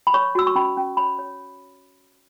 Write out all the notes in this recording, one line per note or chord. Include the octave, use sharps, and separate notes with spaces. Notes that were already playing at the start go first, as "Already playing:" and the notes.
B5
C#5 C#6
F#4 E6
C#6
C#4 B5
C#4
C#5 B5
C#5